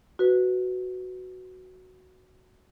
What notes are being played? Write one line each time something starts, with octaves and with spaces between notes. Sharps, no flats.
F#4 B4